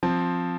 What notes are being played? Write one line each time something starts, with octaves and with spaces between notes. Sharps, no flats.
F3 C4